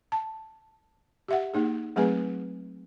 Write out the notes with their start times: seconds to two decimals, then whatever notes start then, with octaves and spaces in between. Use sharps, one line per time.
0.12 A5
1.28 G4 E5 F#5
1.54 A#3 D#4 G#4
1.96 F#3 A3 C4 G#4 B4 G#5